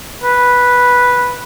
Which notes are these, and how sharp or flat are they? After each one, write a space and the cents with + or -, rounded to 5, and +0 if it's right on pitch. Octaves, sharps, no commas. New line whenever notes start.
B4 -5